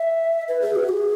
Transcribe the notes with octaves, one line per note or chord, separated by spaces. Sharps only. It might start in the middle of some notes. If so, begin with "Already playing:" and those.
Already playing: E5
B4
G#4
F#4
G#4